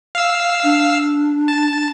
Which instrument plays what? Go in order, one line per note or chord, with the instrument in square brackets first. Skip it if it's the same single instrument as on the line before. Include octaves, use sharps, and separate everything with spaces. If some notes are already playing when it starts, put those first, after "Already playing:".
[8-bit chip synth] F5 E6
[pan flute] D4
[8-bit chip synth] A5